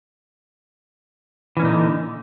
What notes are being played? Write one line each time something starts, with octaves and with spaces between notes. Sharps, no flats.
A#2 D3 E3 C#4 D#4